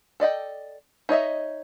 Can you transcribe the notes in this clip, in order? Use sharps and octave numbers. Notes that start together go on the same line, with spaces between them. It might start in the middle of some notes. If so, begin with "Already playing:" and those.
A4 D5 D#5 G5
D#4 C#5 D#5 E5